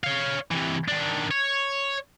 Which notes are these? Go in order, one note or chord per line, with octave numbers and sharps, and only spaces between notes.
C#5 F5
C3 E3
D#3 D4
C#5